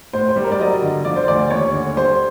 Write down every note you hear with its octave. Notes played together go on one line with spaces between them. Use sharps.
A2 C5
C5
G3
A#4
D5
F#3 D#5
D3
F3 D5
C5
D2 D5
D#2 C#5
D3
G3 C5